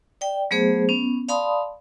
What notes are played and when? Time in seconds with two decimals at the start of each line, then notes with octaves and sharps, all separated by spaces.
0.21 D5 G5
0.51 F#3 A3 B3 G#4 C5
0.89 B3 C#4
1.28 D5 F5 A5 B5 C6 D#6